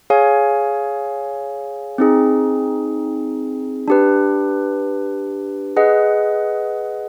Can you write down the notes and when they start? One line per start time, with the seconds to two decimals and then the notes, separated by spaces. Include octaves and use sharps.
0.10 G#4 C#5 F5 G#5
1.98 C4 D#4 G#4
3.88 D4 G4 B4
5.77 G#4 B4 D#5 F#5